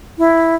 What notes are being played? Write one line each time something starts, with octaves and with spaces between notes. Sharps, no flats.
E4